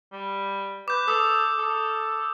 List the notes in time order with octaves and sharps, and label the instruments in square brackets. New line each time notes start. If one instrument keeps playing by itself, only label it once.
[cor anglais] G3
[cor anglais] B4 [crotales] D6 G6
[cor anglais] A4 [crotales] D#6
[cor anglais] A4